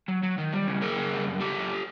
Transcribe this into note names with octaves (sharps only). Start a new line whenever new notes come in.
F#3
F#3
D#3
G3
C#3
F#2 G#4 A#4
C#3
G3
F#2
F#2 G4 A4
F#2